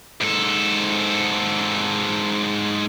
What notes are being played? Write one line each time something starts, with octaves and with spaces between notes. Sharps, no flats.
G#2 A4